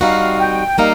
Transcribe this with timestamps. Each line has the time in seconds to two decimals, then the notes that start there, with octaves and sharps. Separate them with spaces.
0.01 G3 C4 D#4 F#4 F5
0.40 G5
0.78 G3 A#3 D#4 F5